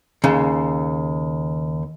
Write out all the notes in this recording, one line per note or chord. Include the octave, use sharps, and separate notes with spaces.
D#2 C#3